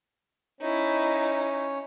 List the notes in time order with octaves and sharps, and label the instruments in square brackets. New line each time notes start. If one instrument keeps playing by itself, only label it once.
[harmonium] C#4 C#5 [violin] D#4 E4